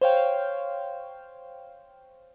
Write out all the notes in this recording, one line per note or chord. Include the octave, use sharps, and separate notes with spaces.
C5 C#5 F5 G5